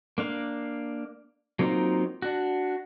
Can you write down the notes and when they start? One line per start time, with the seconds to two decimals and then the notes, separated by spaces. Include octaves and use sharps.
0.18 A#3 D4 F5
1.59 F#3 A#3 C4 D#4 F4
2.22 D4 F#4